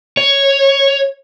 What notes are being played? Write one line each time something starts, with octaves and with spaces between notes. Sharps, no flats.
C#5